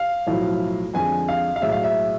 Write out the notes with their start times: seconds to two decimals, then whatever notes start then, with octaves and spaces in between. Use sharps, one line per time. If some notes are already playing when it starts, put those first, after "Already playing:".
Already playing: F5
0.26 B1 A2 F3 A3 E4
0.94 F2 D3 G#3 G#5
1.29 F5
1.56 F5
1.62 B1 A2 G#3 E5
1.72 F5
1.83 E5